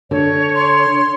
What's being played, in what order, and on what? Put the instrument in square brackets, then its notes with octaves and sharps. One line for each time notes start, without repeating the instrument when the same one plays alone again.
[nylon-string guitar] D3 [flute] C#5
[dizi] C6